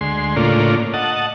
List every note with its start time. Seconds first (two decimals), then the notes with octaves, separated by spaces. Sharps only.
0.01 D2 G#3 C6
0.36 A2 C#3 A#3 D4 F4
0.94 D#5 F#5 A5